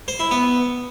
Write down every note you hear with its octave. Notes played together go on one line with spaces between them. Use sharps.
C5
E4
B3